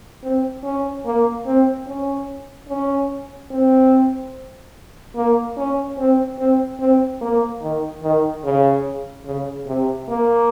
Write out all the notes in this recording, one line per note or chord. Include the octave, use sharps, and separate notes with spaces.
C4
C#4
A#3
C4
C#4
C#4
C4
A#3
C#4
C4
C4
C4
A#3
D#3
D#3
C#3
C#3
C3
A#3